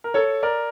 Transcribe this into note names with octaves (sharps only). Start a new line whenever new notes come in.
A#4
A4 C#5
A#4 D5